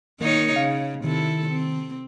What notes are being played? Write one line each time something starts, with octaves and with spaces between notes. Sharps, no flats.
D#3 A#3 D#4 C#5
C#3 F5
C3 D#3 E4 A4
C4